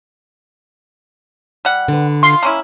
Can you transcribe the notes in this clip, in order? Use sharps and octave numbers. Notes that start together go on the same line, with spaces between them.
G3 F#5
D3 B4
F4 C6
A#3 C#4 E4